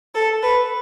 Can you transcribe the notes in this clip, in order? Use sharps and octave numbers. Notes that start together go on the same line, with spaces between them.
A4
B4